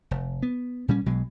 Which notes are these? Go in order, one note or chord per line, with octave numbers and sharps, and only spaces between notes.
F1
B3
A#2 G3 C#4
B1 B2 F#3 G#3